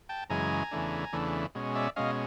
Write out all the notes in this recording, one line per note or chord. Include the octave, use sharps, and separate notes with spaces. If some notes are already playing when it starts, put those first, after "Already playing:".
G5 A5
F#2 C#3 E3 G#3 G#5 A#5
E2 C#3 E3 A3 D4
E2 C#3 E3 A3 D4
B2 G#3 C#4
D5 E5
B2 G#3 C#4 D#5 F5